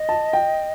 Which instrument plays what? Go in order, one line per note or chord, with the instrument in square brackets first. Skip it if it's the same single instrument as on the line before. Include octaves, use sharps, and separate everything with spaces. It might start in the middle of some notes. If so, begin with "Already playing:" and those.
Already playing: [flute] D#5
[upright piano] A5
G5